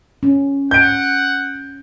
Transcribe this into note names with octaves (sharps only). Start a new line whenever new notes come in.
C#4
F#5 G6 D7